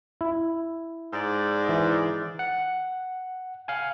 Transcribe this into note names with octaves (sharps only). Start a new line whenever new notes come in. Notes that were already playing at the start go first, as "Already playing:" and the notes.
E4
G#2 D5
E3
F#5
F5 G#5